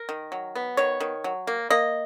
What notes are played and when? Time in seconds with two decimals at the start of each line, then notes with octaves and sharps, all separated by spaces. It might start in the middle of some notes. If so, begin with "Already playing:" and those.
Already playing: A#4
0.09 D#3
0.32 F#3
0.55 B3
0.77 D#3 C#5
1.00 D#3
1.24 F#3
1.47 A#3
1.70 A#3 D#5